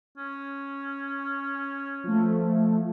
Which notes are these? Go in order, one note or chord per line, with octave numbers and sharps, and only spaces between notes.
C#4
F3 A3